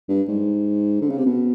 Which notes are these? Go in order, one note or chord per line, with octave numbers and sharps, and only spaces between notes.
G2
G#2
D3
C#3
C3
B2